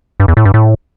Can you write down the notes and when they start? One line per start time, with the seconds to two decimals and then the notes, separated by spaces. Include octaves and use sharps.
0.20 G2
0.28 E2
0.37 A2
0.45 G2
0.54 A2